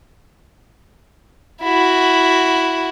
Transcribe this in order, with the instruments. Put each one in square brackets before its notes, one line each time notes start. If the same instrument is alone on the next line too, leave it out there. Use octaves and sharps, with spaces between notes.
[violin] E4 F#4